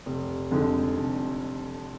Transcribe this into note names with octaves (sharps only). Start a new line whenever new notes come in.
F1
F2 D3 G#3 D#4
F1